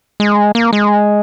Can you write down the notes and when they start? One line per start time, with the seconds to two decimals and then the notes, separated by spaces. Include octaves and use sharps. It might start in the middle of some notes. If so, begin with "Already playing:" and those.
0.20 G#3
0.55 A#3
0.73 G#3